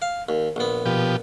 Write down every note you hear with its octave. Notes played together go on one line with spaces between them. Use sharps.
F5
D#2
A#1 B3
B2 F3 G4